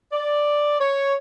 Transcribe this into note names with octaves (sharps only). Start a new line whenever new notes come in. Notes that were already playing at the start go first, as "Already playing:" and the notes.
D5
C#5